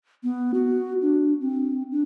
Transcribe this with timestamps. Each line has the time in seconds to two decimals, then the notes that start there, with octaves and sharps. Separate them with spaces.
0.23 B3
0.54 F#4
1.02 D4
1.41 C4
1.92 D4